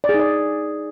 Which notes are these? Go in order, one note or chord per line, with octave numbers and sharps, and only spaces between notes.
D5
G#4
D#4
D5